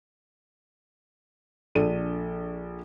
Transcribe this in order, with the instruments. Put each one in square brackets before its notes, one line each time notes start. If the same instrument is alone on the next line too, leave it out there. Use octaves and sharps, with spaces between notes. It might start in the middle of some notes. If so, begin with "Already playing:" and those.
[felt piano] A#1 D4 A4 D#7